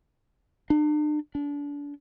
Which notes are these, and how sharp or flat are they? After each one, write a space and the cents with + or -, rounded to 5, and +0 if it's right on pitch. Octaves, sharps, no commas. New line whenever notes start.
D4 +40
D4 -30